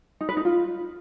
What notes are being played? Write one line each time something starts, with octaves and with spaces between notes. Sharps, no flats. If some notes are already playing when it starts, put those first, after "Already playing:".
D#4
B4
D#4
F4